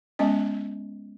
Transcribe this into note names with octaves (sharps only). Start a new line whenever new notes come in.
G#3 B3 C#4 D#5